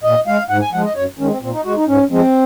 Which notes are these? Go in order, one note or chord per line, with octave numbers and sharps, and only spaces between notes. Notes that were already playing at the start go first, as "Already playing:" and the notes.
A#2 D#5
G#3 F5
G#2 F#5
G#5
F3 G#3 F#5
D#5
F#2 C#5
D#3 G#3 C#4
C4
A#2 C4
D#4
G#3 F#4
D#4
G#2 C#4
F3 G#3 C4